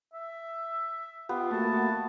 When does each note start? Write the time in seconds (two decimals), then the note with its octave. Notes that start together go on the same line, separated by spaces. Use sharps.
0.13 E5
1.29 B3 F4 G4
1.51 A3 A#3 F#4 A5